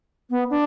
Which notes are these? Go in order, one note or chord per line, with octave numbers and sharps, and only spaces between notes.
B3
D4